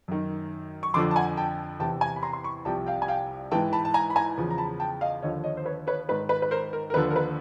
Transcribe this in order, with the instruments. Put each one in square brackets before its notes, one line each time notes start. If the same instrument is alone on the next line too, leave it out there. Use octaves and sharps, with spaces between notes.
[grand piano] F#2 D#3
C#6
F2 D3 F3 C6 D6
A5
F#5 G#5
G5 A5
E2 C3 E3 G5 A5
G#5 A#5
B5
A#5 C6
C6
B5 C#6
C2 C3 F3 G5 A5
F5 G5
G#5
F5 G5
G#2 E3 G5 A5
A5 B5
A5
G#5 A#5
B5
G#5 A#5
E2 C#3 F3
A#5
A5 B5
G5 A5
D#5 F5
D#2 D3 F3 C#5 D#5
C#5 D#5
C5
B4 C#5
B4 C#5
G#2 D#3 B4
B4
B4
A#4 C5
A#4
A#4
D#2 D3 F3 B4
A#4
B4